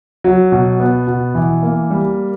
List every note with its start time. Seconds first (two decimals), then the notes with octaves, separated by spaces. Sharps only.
0.24 F#3
0.52 B2
0.80 B3
1.07 B2
1.35 E3
1.63 A#3
1.90 G3